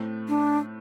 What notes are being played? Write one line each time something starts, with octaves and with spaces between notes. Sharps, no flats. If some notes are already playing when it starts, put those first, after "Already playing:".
Already playing: A2 A3 C4
D4